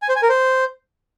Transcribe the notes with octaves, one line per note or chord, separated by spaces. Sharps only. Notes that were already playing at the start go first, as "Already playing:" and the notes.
G#5
C5
G#5
A#4
C5